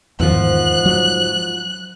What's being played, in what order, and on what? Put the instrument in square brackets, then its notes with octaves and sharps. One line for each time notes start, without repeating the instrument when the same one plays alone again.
[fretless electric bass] E2 D#3 [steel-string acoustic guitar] G#2 F3 [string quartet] F#6
[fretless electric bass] F#3